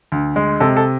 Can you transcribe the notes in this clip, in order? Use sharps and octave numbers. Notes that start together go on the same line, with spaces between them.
D2
G#3
C3 A4
A4